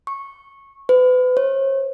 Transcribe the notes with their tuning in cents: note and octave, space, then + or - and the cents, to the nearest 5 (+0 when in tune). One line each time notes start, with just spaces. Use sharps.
C#6 -15
B4 +35
C#5 -45